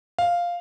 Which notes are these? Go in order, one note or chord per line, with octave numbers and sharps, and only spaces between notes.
F5